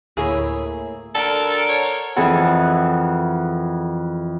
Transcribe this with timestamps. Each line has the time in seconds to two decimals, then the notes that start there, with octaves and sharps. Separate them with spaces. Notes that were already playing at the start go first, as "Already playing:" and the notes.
0.17 D2 A2 A#3 E4 G#4 C#5 E5
1.15 D3 A4 A#4
1.69 C#5
2.16 F2 E3 G#4 A4 F#5